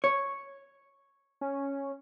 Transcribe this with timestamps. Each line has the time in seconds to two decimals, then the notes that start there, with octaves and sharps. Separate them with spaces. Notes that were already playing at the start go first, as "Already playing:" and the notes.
0.04 C#5
1.41 C#4